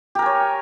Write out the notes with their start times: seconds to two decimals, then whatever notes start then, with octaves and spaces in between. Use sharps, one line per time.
0.15 G4
0.19 A#4
0.22 G#5
0.26 C#5